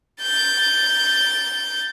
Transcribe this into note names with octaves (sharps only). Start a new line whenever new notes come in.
G6 A6